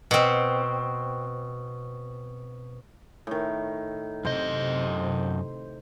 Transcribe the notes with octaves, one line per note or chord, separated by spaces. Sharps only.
B2 C4
A2 D#3
F#2 C3 C5 D#5